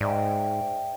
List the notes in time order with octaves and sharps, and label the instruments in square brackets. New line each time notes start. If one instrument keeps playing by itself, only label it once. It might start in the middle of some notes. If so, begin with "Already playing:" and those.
[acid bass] G#2 [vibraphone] D5 E5 G5